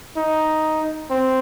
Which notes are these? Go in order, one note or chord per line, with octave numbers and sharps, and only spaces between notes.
D#4
C4